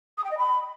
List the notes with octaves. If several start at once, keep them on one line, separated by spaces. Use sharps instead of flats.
D#6
G5
D#5
B5